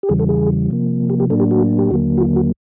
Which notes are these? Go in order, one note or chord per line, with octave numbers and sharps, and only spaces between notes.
G4
E2 C#3 E3 G3 G#4
A4
G#4
C3 F3 A#3
G4
G4
A2 F#3 A#3 D4 A4
G4
F#4
G4
D#2 D3 F#3 A#3 F#4
F#4
F4
F#4